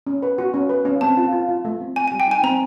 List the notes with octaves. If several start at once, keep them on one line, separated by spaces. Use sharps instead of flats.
C#4
B4
F#4
C#4
B4
C#4
C4 A5
F4
F4
F4
A3
C4
C4 G#5
G#5
G3
G5
D#4 G#5
C4 A#5